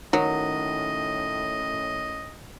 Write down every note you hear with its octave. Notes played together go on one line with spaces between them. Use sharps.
A2 D#3 F#3 C#4 D#5